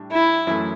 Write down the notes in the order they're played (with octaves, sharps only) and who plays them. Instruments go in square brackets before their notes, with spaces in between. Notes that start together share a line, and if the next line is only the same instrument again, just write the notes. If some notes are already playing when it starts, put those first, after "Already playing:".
Already playing: [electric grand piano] A2 G3 D4
[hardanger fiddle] E4
[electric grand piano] F#2 E3 A3